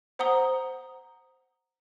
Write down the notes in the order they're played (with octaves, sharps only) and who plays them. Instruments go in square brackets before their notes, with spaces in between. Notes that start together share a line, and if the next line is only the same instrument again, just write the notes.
[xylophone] C5 F#5 A#5 D#6 G7